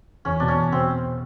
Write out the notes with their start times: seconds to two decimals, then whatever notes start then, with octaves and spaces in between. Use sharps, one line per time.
0.25 E2 C#4
0.40 B2 D4
0.48 C#4
0.57 E2
0.72 B2 C4